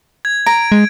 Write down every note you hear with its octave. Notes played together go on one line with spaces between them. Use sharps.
G#6
A#5 D7
G#3